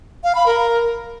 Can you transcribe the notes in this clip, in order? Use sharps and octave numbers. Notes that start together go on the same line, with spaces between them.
F5
B5
A#4